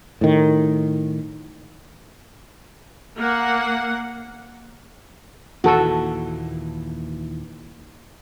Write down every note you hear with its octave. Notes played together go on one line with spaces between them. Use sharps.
A2 D#3
A#3 F#5
D#2 A#2 E3 F#4 A4